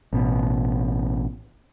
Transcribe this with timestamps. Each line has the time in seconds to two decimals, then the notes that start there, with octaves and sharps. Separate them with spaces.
0.13 A1 B2